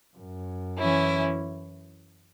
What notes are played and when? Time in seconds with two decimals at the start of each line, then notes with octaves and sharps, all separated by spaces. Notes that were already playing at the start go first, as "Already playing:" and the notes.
0.16 F#2
0.78 E3 C#4 E4